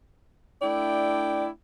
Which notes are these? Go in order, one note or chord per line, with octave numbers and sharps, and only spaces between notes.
A3 D4 E4 D5 G5